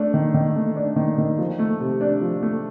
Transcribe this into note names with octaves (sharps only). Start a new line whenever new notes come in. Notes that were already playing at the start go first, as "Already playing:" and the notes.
Already playing: A3 D4
D#3
D#3
A3
D4
D#3
D#3
F3
A3
C3
D4
F3
A3